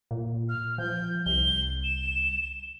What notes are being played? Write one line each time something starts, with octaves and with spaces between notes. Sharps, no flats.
A#2
F6
F3 G6
C2 G7
E7